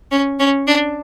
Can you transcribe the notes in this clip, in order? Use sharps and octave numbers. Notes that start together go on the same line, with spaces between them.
C#4
C#4
D4